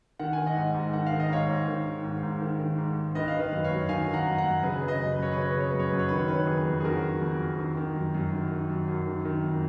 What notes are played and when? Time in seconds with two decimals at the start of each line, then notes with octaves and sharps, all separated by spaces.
0.19 D#3 F#5
0.33 D#3 G#5
0.47 D#5 F#5
0.57 G#2
0.74 G#2
0.93 D#3 F#5
1.06 F5
1.12 D#3
1.20 D#5
1.30 G#2 C#5 F5
1.49 G#2
1.67 D#3
1.86 D#3
2.04 G#2
2.23 G#2
2.41 D#3
2.59 D#3
2.78 G#2
2.97 G#2
3.15 D#3 B4 D#5
3.28 F5
3.33 D#3
3.40 B4 D#5
3.52 F#2
3.64 C#5 F5
3.70 F#2
3.89 D#3 F5 G#5
4.08 D#3
4.14 F#5 A#5
4.26 F#2
4.38 F#5 A#5
4.45 F#2
4.63 C#3 G#4 B4
4.81 C#3
4.88 B4 D#5
5.00 F#2
5.12 B4
5.18 F#2 C#5
5.32 B4
5.37 C#3 C#5
5.51 B4
5.56 C#3 C#5
5.70 F#2 B4
5.79 C#5
5.89 F#2 B4
5.99 C#5
6.08 D#3 B4
6.18 C#5
6.28 D#3 B4
6.37 C#5
6.47 F2 G#4 B4
6.66 F2
6.80 G#4
6.84 D#3 F#4 A#4
7.04 D#3
7.22 F2
7.41 F2
7.59 D#3
7.77 D#3
7.96 F#2
8.14 F#2
8.33 D#3
8.51 D#3
8.70 F#2
8.88 F#2
9.06 D#3
9.25 D#3
9.44 F2